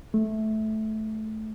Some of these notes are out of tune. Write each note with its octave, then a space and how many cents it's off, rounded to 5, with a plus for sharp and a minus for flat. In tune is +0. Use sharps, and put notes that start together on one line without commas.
A3 -15